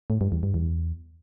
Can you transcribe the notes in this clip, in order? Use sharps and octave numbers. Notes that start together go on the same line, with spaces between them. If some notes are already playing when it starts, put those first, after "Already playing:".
A2
G2
E2
G2
E2